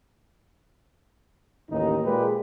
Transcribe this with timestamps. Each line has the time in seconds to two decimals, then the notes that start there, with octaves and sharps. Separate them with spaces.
1.70 A1 D#2 D#4
2.04 A#2 G#3 G4 B4